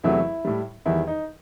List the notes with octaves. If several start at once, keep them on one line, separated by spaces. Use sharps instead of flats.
E2 C3 F#3 A3 E4
A2 G3
E2 D#3 G3 E4
D#4